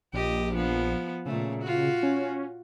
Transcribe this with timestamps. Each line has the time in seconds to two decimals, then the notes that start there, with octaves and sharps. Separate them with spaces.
0.13 A#1 G4 D#5
0.54 F3 B3
1.26 A#2 C#3 A3
1.62 F4 F#4
2.03 C#4